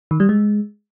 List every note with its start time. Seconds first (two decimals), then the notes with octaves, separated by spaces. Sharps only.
0.11 D#3
0.20 G3
0.29 G#3